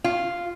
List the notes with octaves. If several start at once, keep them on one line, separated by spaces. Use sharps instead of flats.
F4